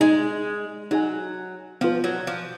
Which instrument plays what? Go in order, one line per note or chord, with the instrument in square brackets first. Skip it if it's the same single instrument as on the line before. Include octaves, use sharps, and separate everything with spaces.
[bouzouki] G#3 [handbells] D#4 G#4 D#5 G#5
[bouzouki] F#3 [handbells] D#4 G#4 D#5 G#5
[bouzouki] F3 [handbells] B3 F4 B4
[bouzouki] F#3
F3